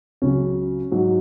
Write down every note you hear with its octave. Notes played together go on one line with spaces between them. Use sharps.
C#2 C#3 F#3 C#4
G#2 F#3